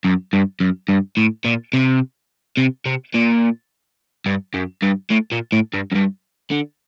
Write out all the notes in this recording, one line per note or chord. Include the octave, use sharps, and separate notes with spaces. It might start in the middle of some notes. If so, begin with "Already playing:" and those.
F#2
G2
F#2
G2
A2
A#2
C3
C3
C3
A#2
G2
F#2
G2
A2
A#2
A2
G2
F#2
G2
D3